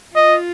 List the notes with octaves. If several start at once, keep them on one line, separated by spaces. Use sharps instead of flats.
F4 D#5